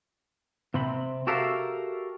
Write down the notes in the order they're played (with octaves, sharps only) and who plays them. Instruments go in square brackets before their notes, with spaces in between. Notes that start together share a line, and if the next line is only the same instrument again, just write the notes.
[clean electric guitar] C3 C4 B5
F#4 G4 A4 A#4 E5 F5